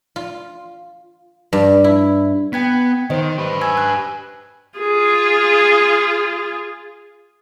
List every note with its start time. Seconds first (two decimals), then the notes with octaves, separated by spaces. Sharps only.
0.16 F4
1.53 G2
1.84 E4
2.53 B3 G5 G#6 B6
3.10 D#3 C5 D#5
3.39 G4 B4
3.61 G#5 E6 G#6
3.77 F#6
4.79 F4 G#4